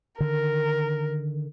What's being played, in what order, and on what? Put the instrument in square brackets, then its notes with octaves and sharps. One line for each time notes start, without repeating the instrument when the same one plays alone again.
[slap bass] D3 D#3 [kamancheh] A#4